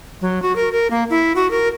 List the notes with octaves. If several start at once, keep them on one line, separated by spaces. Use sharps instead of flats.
F#3
F#4
A#4
A#4
A#3
E4
F#4
A#4